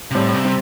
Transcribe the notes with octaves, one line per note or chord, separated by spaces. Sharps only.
C3
A2 G3 C4
C3
G3 C4